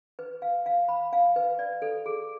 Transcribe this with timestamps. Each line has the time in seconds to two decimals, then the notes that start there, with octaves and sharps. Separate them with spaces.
0.19 B4
0.42 F5
0.66 F5
0.89 B5
1.13 F5
1.36 B4
1.59 D5
1.82 A4
2.06 G#4